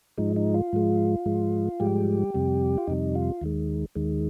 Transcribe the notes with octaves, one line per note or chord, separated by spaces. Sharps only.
G#2 F3 G#3 D#4
D#4
F4
G#2 F3 G#3
G#2 F3 G#3
G#2 F3 G3 G#3 G4
F2 C3 G3
F4
F2 C3 G3 D#4
F4
D#2 D#3 G#3
D#2 D#3 G#3